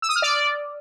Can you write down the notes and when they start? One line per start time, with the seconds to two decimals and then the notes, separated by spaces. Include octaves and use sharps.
0.02 E6
0.09 D#6
0.16 F6
0.22 D5